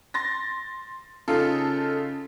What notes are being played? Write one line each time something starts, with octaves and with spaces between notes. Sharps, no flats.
C6 A6 A#6
C#3 D#4 F4 A4 F5